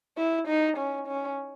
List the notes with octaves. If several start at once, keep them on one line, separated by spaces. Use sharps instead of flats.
E4
D#4
C#4
C#4